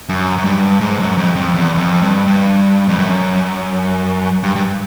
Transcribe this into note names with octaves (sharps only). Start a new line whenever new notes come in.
F#2
F#2
G2
G#2
F#2
F2
F2
E2
E2
F2
G2
G2
F2
F#2
G2
G2